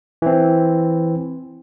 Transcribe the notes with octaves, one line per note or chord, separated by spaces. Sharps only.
E3 C4